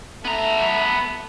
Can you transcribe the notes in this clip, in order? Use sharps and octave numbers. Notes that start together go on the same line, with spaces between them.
A3 B3 E5 A#5